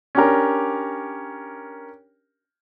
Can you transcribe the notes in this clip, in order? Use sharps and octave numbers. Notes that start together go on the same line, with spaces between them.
C#4 D4 G4 A#4